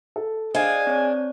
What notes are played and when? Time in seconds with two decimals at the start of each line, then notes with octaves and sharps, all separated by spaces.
0.16 A4
0.55 D4 G#4 C5 D#5 F5 G#5
0.87 C4 C#5